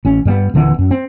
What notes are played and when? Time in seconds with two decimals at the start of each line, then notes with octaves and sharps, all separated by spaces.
0.05 A1 C#4
0.25 G2 G3 A3 B3
0.54 D#1 D3 E3 B3
0.79 F#2
0.91 C4